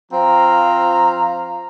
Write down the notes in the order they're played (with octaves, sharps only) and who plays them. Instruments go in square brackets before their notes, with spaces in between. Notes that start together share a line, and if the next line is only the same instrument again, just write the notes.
[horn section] F3 C4 F5 A#5